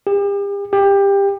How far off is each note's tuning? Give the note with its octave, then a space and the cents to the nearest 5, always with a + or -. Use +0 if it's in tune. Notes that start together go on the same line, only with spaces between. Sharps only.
G4 +40
G4 +20